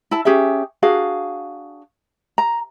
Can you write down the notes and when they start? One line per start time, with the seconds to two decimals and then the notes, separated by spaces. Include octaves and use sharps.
0.11 E4 A5
0.25 C#4 G4 G#4 E5
0.82 D4 F#4 G#4 F5
2.38 A#5